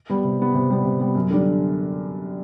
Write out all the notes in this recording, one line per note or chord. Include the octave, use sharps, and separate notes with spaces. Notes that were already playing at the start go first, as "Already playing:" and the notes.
G3 B3
C3
G3 B3
C3
G3 B3
C3
G3 B3
F#2
D3 G3 D4